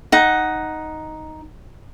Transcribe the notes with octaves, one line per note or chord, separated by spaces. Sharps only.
D#4 F#5